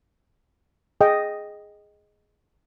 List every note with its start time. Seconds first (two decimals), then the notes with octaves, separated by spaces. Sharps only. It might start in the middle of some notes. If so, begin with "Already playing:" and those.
1.01 G#4 D#5 G5